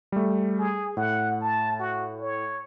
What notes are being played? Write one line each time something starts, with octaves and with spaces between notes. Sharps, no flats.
G3 A3
G#4
A2 F#5
A5
F#4
C#5